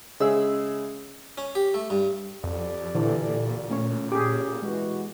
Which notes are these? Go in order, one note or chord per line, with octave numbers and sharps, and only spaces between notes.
C#3 G#3 G#4 E5 E6
C#4
G4
A3
G2
F2 G4 A4 D5
A#2 D3 E3
A3 C#4 C#5
C#4 G4 G#4 D6
B2 E3 G#3 F#4